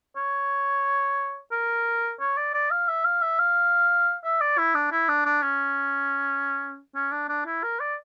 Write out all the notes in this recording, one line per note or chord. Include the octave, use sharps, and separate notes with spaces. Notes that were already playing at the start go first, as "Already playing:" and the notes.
C#5
A#4
C#5
D5
D5
F5
E5
F5
E5
F5
E5
D5
E4
D4
E4
D4
D4
C#4
C#4
D4
D4
E4
A#4
D5